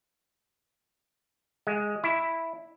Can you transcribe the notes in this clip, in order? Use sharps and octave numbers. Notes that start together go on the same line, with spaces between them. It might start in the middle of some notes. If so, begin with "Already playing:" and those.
G#3
E4